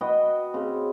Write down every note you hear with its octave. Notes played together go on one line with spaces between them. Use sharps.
F#4 B4 D#5 G5
C#3 C4